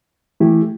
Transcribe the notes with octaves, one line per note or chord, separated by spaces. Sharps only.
E3 A3 E4 G4